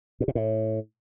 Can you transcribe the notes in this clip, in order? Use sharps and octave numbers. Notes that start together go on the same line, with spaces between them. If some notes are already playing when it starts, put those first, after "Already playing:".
A#2
C3
A2